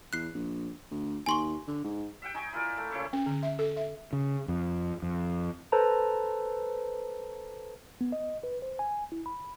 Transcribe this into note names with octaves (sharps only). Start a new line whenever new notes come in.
E2 F#6 C7
A#1
D2
D#2 G#5 C6 C#6
D3
G#2
E5 F#5 G5
D#4 G#5 C#6
E4 F4 A#4 D5
A3
A#2 C#3 E4 C#6
C#4
D3
E5
A4
E5
C#3
F2
F2
A4 B4 C5 A5 A#5
B3
D#5
B4
C5
G#5
E4
B5